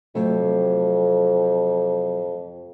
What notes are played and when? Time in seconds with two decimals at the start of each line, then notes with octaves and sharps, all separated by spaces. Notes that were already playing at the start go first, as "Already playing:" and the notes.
0.15 F2 C3 F#3 A3